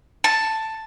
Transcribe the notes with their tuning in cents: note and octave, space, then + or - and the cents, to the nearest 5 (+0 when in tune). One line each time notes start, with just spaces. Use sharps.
A5 +5